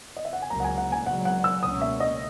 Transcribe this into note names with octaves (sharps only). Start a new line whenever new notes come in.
D#5
E5
F#5
G#5
C#2 C#3 F#3 A#3 A#5
F#5
G#5
F#5
G#5
C#2 C#3 F#3 F#5
F#5
E6
C#2 B2 A#3 C#4 D#6
E5
D#5